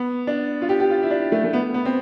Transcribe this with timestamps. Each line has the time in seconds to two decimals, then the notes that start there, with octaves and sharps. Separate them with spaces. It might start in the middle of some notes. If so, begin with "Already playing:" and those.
Already playing: B3
0.27 D4
0.62 F4
0.69 G4
0.80 G4
0.90 F4
1.03 E4
1.11 D4
1.32 A3
1.44 A3
1.53 B3
1.74 B3
1.85 C4